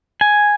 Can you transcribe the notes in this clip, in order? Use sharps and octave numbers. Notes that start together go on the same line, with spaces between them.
G#5